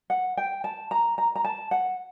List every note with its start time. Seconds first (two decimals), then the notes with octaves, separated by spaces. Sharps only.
0.10 F#5
0.37 G5
0.64 A5
0.91 A#5
1.18 A#5
1.36 A#5
1.45 A5
1.71 F#5